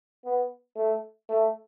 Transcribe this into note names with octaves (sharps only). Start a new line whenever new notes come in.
B3
A3
A3